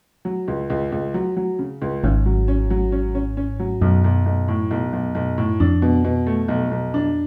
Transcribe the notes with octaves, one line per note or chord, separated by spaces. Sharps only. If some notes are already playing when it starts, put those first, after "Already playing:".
F#3
C#2
C#2
C#2
F#3
F#3
C#3
C#2
G#1 G#2 C#4
F#3
C#4
F#3
C#4
C#4
C#4
F#3
B1 F#2
B1
B1
A2
B1
B1
B1
A2
F2 D4
B2
B2
A3
B1
B1
D4